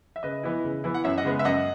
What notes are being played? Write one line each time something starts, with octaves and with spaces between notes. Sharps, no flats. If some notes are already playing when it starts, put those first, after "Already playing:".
E5
C#3 B4 D#5
E3 B3 E4
C#3
E3 B3 E4
F#5
F#2 C#5 E5
D#5 F#5
C#3 G#3 B3
E5
F#2 D#5 F#5